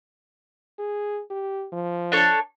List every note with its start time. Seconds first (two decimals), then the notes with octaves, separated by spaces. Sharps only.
0.79 G#4
1.30 G4
1.72 F3
2.12 D4 A4 C#5